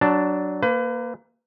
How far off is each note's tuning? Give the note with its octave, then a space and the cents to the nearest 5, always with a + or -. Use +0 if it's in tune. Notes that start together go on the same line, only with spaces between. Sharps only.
F#3 +15 D4 +0 A5 +0
A#3 +0 B4 +35